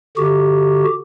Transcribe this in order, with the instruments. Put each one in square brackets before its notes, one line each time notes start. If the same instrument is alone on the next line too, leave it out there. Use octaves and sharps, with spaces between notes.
[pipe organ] D3 F#4 G4